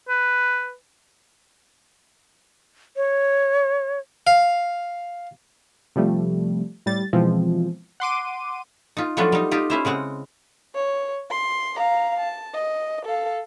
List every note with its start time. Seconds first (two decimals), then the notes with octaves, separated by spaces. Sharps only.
0.09 B4
2.96 C#5
4.27 F5
5.96 C3 F3 G3 A3
6.86 A2 G3 A6
7.13 B2 E3 F3 G#3 C4
8.00 F#5 C6 D6 D#7
8.97 D#4 F4
9.17 F3 F#3 A3 B3 D4 F4
9.32 G3 D#4
9.51 D#4 F4 G4
9.70 C#4 E4 C5
9.85 C#3 G#3 C4 F#5
10.75 C#5
11.31 C6
11.76 F5 A#5
12.20 A5
12.55 D#5
13.06 A4 F5